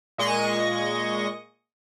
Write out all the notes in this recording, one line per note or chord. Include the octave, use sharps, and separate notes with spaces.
A#2 G#3 D#5 C#6 A#6